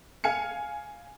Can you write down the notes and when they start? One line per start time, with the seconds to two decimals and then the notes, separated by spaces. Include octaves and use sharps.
0.24 F5 G#5 F6 C#7